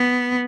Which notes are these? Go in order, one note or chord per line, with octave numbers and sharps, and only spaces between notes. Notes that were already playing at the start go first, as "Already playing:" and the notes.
Already playing: B3